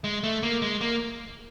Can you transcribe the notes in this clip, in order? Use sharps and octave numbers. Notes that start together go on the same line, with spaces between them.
G#3
A3
A#3
G#3
A#3